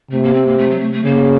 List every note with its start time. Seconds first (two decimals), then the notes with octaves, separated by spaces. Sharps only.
0.11 C3 A3
0.23 A#3
0.34 C4
0.46 A#3
0.58 A3
0.69 F#3
0.80 A3
0.92 A3
1.04 C#3 A#3